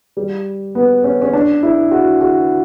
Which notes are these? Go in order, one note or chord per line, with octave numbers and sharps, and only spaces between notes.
G3
B3
C#4
C#4
D4
E4
F#4
F#4